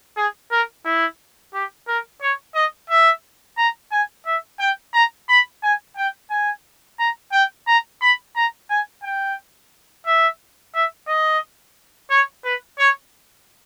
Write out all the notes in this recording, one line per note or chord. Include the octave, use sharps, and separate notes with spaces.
G#4
A#4
E4
G4
A#4
C#5
D#5
E5
A#5
G#5
E5
G5
A#5
B5
G#5
G5
G#5
A#5
G5
A#5
B5
A#5
G#5
G5
E5
E5
D#5
C#5
B4
C#5